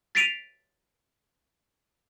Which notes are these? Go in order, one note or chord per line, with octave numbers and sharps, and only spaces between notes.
A6 B6 C7 D7 D#7 F7